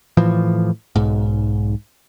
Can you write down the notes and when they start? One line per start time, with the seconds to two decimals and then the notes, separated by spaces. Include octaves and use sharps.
0.17 A2 E3 F3
0.96 B1 G#2